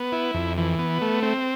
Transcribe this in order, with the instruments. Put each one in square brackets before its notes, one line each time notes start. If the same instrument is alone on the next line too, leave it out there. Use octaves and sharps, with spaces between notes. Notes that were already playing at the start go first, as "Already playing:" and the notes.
Already playing: [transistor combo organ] B3
E4
F2
E3
B3
A3
C4